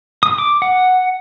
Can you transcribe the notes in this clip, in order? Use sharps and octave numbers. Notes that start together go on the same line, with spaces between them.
D#6
D6
F#5